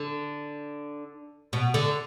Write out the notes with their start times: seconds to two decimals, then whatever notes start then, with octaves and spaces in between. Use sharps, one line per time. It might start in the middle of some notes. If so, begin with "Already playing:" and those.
Already playing: D3
1.53 B2
1.74 D3